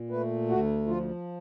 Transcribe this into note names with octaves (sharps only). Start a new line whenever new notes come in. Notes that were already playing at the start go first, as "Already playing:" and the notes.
Already playing: A#2
A3 B4
D2 F#4
F3 F4